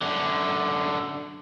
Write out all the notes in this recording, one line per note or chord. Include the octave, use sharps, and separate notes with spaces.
F#2 D3